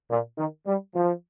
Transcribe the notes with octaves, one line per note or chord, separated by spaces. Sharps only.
A#2
D#3
G3
F3